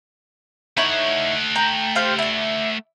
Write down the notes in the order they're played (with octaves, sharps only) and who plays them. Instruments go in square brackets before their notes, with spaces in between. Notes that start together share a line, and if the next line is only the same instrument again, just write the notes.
[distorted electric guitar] A3 F#5 [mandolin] D#4 E4 C#5
[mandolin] G5 A#5
G4 C5 F5
E4 D5